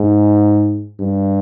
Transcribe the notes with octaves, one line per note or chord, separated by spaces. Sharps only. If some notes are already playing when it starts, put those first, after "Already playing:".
Already playing: G#2
G2